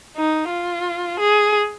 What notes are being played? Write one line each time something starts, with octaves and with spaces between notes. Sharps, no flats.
D#4
F4
G#4